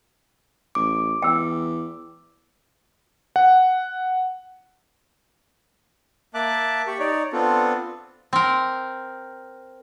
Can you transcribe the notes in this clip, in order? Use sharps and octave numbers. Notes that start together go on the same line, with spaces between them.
A1 D6
E2 G5 E6
F#5
A#3 E5 A5 D6 F#6
G4 C#6
D#4 C#5 D5
B3 C4 D4 F4 A4
C4 A#4